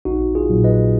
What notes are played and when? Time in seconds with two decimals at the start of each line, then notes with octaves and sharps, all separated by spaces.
0.05 A#1 D#4 F#4
0.35 F4 G#4
0.49 A#2 F#3
0.64 B4 D#5